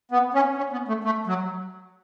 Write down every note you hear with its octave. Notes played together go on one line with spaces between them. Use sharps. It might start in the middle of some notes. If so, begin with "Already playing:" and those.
B3
C#4
C#4
B3
A3
A3
F#3